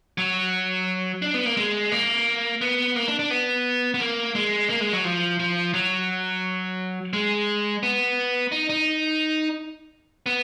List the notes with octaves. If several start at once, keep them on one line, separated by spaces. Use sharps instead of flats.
F#3
D4
B3
A#3
G#3
A#3
B3
A#3
D4
D4
B3
B3
A#3
G#3
A#3
G#3
F#3
F3
F3
F#3
G#3
B3
D#4
D#4
B3